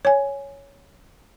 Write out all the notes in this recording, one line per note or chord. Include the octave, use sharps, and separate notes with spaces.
C#5 G#5